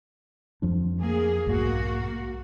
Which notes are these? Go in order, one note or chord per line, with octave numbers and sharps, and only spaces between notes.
F2 F3 D4
A#3 G#4
B1 G#2 A#3 F#4